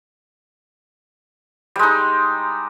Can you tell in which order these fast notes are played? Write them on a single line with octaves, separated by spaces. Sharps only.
G3 G#3 D#4